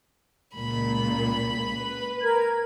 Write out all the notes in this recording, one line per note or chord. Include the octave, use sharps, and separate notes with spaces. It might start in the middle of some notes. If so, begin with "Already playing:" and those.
C#2 A#2 B5
B4
A#4 G#6